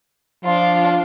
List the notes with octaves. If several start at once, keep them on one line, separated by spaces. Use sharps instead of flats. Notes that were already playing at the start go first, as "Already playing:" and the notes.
F3 D4 F4